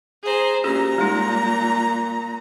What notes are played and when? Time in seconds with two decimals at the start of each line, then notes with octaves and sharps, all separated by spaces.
0.23 G#4 C5 A#5
0.64 A#2 C#4 F#4 G4 A#5
0.98 G3 G#3 D#4